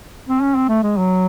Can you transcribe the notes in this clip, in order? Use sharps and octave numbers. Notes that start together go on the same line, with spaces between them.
C4
C#4
C4
A3
G#3
F#3